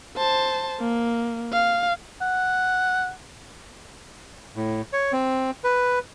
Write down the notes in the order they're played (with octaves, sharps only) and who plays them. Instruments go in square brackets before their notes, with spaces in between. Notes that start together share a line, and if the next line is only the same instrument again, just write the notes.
[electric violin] C5 A5
A#3
F5
[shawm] F#5
[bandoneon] A2
C#5
C4
B4